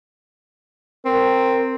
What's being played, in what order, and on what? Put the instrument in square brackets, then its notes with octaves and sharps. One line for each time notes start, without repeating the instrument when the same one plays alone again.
[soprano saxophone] C4 [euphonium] A#4